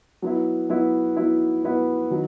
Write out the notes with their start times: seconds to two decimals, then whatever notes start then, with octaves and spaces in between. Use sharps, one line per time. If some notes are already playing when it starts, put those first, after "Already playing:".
0.22 F#3 B3 E4
0.69 F#3 B3 E4
1.16 F#3 B3 E4
1.63 F#3 B3 E4
2.10 D#3 F#3